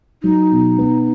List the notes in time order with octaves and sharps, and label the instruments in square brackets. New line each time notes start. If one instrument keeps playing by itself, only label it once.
[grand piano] F#3 [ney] D#4
[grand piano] B2
B3